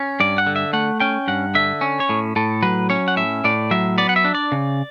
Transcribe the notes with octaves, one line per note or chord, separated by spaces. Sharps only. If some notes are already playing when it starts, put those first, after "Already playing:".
Already playing: C#4
G2 D5
F#5
D3
E5
A3 F#5
C#4 G5
G2 F#5
D3 E5
C#4
C#5
A2
A2 A4
F#3 B4
C#4 C#5
F#5
A2 E5
A2 D5
F#3 E5
B3 D5
F#5
E5
D4
D5
C#3